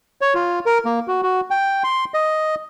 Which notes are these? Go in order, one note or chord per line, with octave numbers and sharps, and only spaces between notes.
C#5
F4
A#4
A#3
F#4
F#4
G5
C6
D#5